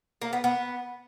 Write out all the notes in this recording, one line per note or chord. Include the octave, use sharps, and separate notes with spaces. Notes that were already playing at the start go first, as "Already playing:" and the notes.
A#3
B3
B3